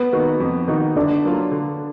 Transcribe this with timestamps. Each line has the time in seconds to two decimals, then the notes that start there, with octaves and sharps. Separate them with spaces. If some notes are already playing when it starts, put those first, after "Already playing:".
Already playing: B3
0.12 D#3 A#3 D#4 F#4
0.40 F2
0.68 D#3 A#3 D#4 F#4
0.96 D3 D4
1.25 F#3 A#3 F4
1.52 D3